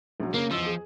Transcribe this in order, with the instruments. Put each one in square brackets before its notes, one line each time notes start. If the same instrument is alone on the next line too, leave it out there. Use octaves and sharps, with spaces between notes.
[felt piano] A#1 F#3
[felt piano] C#3 [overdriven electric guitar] A#3
[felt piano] E2 D#5 E6 [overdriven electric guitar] F3
[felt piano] G#4